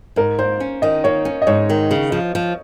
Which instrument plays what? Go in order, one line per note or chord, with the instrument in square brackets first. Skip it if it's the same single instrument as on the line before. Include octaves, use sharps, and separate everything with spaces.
[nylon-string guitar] G#2 [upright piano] A#4
[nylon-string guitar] A#3 [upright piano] C5
[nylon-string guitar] C#4
[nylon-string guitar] D#3 [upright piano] D#5
[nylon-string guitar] A#3 [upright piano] C#5
[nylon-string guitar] C#4
[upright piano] D#5
[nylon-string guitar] G#2 [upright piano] C#5
[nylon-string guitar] D#3
C#3
F3
F3